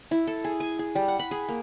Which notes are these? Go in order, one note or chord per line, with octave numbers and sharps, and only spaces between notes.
E4
A4
G#4
G#5
G#4
G3
F#5
B5
G#4
A#3